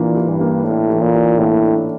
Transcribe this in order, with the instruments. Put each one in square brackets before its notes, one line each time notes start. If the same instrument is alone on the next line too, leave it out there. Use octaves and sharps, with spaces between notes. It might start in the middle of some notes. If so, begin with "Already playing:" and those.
Already playing: [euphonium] A#2 [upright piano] E3 A#3 D4
[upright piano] E3
[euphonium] G2
[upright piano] A#3
[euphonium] A2 [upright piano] D4
[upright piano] E3
[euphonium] A#2
[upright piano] E3
[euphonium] A2 [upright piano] A#3
[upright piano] D4